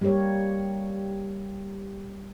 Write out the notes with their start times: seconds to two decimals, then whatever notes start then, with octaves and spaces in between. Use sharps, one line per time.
0.01 G3 A#3 G4 A#4 C#5